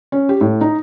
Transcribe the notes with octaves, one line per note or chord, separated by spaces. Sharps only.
C#4
G4
A2
D#4